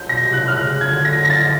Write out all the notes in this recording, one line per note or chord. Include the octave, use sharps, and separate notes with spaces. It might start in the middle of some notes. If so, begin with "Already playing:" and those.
Already playing: G6
B2 A#6
C3
F#6
C3
F6
C#3 F#6
C#3
G#6
D3
A#6
A#6
A6